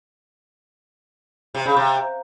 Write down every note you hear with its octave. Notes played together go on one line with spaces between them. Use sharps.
C3
C#3
C3